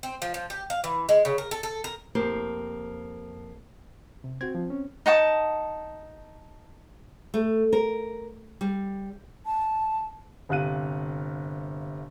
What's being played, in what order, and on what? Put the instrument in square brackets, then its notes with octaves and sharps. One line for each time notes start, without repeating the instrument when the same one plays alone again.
[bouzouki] C4
F3
F3
G4
F5
E3
G#3
C#3
A#4
A4
A4
A#4
[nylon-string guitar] F2 A#3 G4 C5
[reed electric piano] C3
[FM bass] C4 [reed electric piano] F#4 G#6
[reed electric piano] F3
C#4
[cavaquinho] D#4 F#5 A5 D#6
[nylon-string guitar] A3
A#4
G3
[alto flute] A5
[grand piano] G1 C3 F5 F#6 D#7